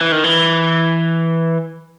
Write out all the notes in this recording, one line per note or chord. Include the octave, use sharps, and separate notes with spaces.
E3
D#3
E3